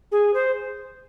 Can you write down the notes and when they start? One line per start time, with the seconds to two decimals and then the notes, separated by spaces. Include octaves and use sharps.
0.11 G#4
0.34 C5